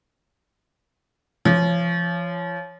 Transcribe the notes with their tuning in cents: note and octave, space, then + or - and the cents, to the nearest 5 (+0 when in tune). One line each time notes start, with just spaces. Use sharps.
F3 -30 C#5 +0